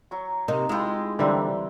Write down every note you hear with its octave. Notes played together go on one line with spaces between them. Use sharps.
F#3 C#6
C3 A#3 D#4
G#3 E4 F4 G5
D3 E3 G3 A#3 C4 D4